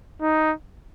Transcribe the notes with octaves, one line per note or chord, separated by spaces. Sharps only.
D#4